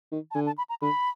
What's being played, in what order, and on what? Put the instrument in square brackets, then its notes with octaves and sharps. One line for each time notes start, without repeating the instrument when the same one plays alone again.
[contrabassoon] D#3
[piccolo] A5
[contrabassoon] D3 [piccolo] G#5
[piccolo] A5
B5
A#5
[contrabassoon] D3 [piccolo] B5